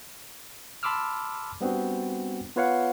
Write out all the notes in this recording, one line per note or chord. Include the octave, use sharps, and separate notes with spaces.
A5 B5 C6 D6 E6 F6
G3 B3 C4 D4 F#4
B3 F4 B4 C#5 F5 F#5